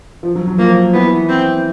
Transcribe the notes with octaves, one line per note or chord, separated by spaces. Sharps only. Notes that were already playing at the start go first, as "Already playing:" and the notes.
F3
F#3
F#3
F3 A#3
E3 B3
C4